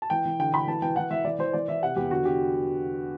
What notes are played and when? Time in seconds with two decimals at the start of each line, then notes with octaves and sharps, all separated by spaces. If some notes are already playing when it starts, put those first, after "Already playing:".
0.02 A5
0.10 E3 G5
0.25 E3
0.39 D3 G5
0.53 D3 B5
0.67 E3 A5
0.82 E3 G5
0.96 E3 F#5
1.11 E3 E5
1.24 E3 D5
1.39 E3 C5
1.53 E3 D5
1.68 E3 E5
1.83 C3 F#5
1.96 E2 G4
2.11 D3 F#4
2.25 D3 G4